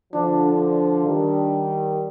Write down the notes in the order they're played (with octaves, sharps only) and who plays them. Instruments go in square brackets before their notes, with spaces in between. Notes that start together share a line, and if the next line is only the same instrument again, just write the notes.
[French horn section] D3 F3 [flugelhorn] D4
[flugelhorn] D4
[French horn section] D#3 G3